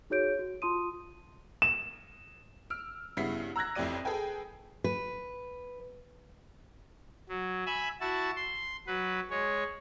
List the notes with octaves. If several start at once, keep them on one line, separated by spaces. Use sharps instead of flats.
D#4 F#4 G#4 C#5 G6 D7
F#4
F4 A5 C6 D#6 D#7
E7
E6 F6 D7
G2 C#3 B3 E4 B6 C7
A#5 E6 F#6 G#6 A#6
A1 F2 A2 G4 D5 D#7
G#4 A4 B4 G5 G#5
B4
F#3
E5 G#5 B5
E4 F#4 A5
C6
F#3 B4
G#3 C#5